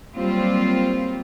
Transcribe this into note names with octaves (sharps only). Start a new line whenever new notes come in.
F#3 G3 A#3 C4 F4